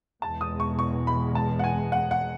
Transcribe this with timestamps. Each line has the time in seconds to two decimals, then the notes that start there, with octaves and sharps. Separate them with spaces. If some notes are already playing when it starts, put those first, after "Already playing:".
0.22 E2 B2 G#3 A5
0.41 D#6
0.60 C#6
0.79 C#6
1.07 B5
1.35 A5
1.59 F#5
1.64 G#5
1.92 F#5
2.11 F#5